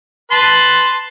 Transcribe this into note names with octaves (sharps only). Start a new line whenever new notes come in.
B4 A5 C6